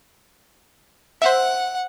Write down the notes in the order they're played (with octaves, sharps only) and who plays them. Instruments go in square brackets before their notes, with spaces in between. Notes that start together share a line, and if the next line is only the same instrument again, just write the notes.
[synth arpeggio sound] C5 E5 [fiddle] F#5